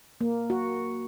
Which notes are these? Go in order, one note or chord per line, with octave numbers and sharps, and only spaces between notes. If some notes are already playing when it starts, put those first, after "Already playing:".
A#3
F#4